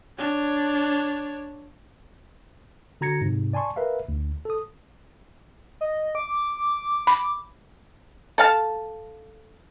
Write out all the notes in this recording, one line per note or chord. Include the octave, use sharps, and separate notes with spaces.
D4 C#5
D3 F#4 A#5 G#6 A#6 C#7
G#2 C3
D5 G#5 A5 C6 C#6
A#4 B4 E5 F5
D2
A4 D#6
D#5
D6
B5
A4 F5 A5